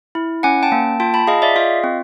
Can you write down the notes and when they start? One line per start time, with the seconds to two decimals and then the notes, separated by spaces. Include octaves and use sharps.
0.15 E4
0.43 C#4 F#5 G#5
0.63 G5 A5
0.72 A#3
1.00 F4 G5 A5
1.14 A5 B5
1.27 G#4 D#5 F5
1.42 D5 E5
1.56 F4 D#5 F5
1.84 C4